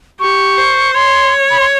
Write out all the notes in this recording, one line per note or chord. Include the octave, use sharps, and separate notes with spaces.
G4 C#6
C5
C#5 C6
B5
C6